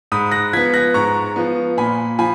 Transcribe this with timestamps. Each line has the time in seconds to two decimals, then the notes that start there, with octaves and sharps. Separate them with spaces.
0.12 G#2 B5 D#6
0.32 F#6 A#6
0.53 F3 B3 G#6 B6
0.74 F#6 A#6
0.94 G#2 A#5 C#6
1.36 F3 B3
1.77 A#2 G#5 B5
2.19 F3 G#5 B5